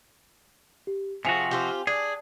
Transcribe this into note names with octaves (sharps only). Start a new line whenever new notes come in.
G4
C3 F3 F#4 G#4 G#5 F7
C4 F4 G4
D4 G#4